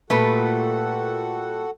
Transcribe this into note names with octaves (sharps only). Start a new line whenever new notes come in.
A#2 G3 A3 F#4 A4 B4 F#5